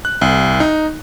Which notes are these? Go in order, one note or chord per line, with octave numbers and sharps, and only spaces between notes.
F#6
C2
D#4